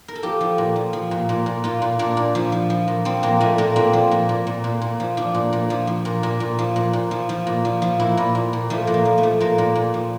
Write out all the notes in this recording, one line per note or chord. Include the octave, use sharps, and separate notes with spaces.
A#4
A4
F3 G4
F3
A#2
F3
F3
A#2
A#2
A#2
A#2 F4
A#2
A#2 D4
A#2
F3
F3
F3
A#2
F3 C4
A#2 A#3
A#2 A3
A#2 A#3
A#2 C4
F3
A#2
A#2
A#2
A#2
A#2
F3
F3 D4
A#2
A#2
F3
F3
A#2
A#2
A#2
F3
A#2
A#2
F3
F3
A#2
F3
F3
A#2 E4
A#2
A#2
A#2
F3 A3
A#2
A#3
F3
A3
F3
A#2 A#3
A#2
A#2
F3